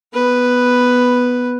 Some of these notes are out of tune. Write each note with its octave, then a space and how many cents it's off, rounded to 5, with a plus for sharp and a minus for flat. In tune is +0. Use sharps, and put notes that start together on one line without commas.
B3 +0 B4 +0